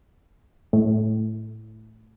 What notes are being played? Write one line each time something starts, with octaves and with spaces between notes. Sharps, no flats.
A2